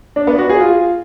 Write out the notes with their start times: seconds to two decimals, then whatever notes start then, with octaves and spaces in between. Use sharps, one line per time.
0.16 D4
0.27 B3
0.38 F#4
0.49 G#4
0.61 F4